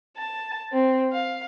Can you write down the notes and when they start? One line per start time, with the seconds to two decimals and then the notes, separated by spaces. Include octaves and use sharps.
0.17 A5
0.72 C4
1.13 F5